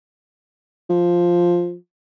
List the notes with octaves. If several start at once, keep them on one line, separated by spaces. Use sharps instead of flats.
F3